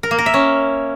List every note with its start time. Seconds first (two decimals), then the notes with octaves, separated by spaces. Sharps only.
0.03 A#4
0.11 A#3
0.19 A#4
0.26 E5
0.34 C#4